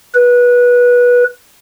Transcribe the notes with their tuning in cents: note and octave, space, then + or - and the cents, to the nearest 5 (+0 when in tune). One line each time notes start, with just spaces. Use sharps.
B4 -20